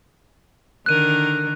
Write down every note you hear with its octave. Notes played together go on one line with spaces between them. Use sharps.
D3 D#3 A#4 F#6 D#7